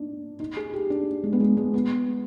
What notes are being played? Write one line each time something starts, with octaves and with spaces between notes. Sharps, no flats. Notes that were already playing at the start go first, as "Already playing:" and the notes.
Already playing: D4 D#4
D#4
G#4
G4
D4
G#3
B3
G#3
G#3
B3